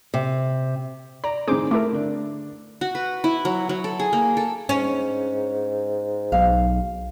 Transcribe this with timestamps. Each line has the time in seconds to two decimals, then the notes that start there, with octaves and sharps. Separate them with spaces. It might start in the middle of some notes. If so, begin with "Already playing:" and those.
0.14 C3
1.24 D5 A#5
1.47 A2 D#3 G#4 C5 D6
1.71 A3 E4 A#4 D6
1.93 D3 D4
2.81 F#4
2.95 B4
3.24 E4
3.45 F#3
3.69 F#3
3.84 A4
3.99 G#4
4.13 A#3
4.37 A4
4.69 G#2 C#4
6.32 B1 F5